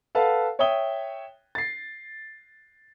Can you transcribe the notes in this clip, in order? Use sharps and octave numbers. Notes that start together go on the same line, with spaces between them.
A4 B4 F5 F#5 A5
C#5 E5 G5 D#6 G7
A6 C7